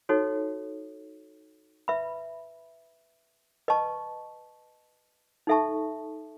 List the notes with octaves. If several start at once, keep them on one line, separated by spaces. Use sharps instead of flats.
D#4 F#4 A4 C#5
B4 E5 B5
B4 D#5 A5 C#6
D#4 A4 E5 A5 C#6